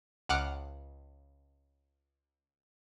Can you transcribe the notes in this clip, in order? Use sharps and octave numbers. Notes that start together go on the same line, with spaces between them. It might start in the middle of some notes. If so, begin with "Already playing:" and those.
C#2 F#5 D6 F6 F#6